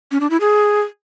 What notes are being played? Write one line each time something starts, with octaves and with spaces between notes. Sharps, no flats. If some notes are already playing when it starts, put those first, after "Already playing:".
C#4
D4
E4
G#4